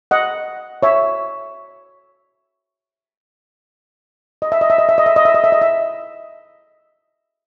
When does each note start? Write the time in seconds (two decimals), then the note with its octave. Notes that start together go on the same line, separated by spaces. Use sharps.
0.11 D#5 F#5
0.83 C#5 E5
4.42 D#5
4.52 E5
4.61 D#5
4.70 E5
4.78 D#5
4.89 E5
4.98 D#5
5.06 E5
5.16 D#5
5.25 E5
5.34 D#5
5.44 E5
5.52 D#5
5.61 E5